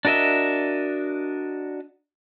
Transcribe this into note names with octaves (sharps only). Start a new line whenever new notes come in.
D4 F#4 A#4 D#5 E5